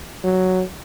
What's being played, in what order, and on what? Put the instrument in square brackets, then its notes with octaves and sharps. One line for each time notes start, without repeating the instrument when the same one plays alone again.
[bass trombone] F#3